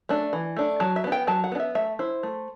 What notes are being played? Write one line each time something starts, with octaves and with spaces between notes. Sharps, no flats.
A3 D4
E3
A3 D4
F#3 A5
E5
B3 D4
G5
F#3 A5
F#5
B3 D4
E5
A3 E5
E4 C5
A3